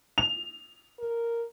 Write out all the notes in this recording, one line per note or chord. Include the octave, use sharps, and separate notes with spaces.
F7
A#4